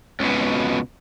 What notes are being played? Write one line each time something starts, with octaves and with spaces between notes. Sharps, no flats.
C#2 B2